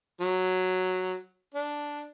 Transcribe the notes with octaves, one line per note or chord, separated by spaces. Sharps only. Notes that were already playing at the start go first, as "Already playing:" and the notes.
F#3
D4